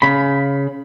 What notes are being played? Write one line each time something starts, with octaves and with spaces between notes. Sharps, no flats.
C#3 B5